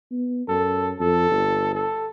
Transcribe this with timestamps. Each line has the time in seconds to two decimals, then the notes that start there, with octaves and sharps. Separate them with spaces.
0.12 B3
0.49 F#2 A4
1.00 F2 A4
1.30 G1
1.75 A4